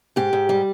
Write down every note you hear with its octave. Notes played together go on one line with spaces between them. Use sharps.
G#2 G4
G#2
G3